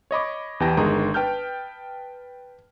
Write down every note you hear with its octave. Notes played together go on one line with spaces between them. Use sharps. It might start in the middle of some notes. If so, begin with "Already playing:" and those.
C#5 D#5 B5 D6
E2 E3 G4 G5 A5 A#6
G1 D#3 G#3 A#5 C6 D#6
B4 G5 A5 F6 G6